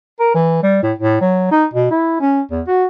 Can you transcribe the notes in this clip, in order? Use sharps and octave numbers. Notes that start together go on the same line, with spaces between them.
A#4
E3
G3
A2
A2
F#3
D#4
B2
E4
C#4
E2
F#4